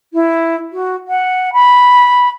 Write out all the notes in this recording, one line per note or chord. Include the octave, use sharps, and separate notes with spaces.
E4
F#4
F#5
B5